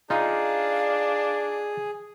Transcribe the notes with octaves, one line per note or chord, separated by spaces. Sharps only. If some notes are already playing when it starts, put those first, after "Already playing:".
D4 D#4 F4 G#4 F5